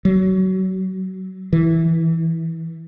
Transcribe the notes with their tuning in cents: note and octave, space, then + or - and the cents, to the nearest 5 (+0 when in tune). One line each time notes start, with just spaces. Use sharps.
F#3 +25
E3 -10